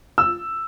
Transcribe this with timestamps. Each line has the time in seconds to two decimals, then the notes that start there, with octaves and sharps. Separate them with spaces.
0.18 E6